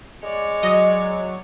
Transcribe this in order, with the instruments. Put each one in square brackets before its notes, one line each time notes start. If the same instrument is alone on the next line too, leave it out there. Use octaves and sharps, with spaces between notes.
[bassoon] G#3 [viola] C#5 D5
[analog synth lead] F#3 [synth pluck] D#5